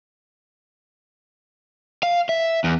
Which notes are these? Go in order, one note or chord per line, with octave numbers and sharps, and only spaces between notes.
F5
E5
E2